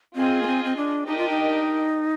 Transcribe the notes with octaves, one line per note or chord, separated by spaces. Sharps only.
C4 F4 G#4 D#5 G#5
A#3
C4
C4
D4
D4 D#4 G4 A#4 D#5 G5
F4
D#4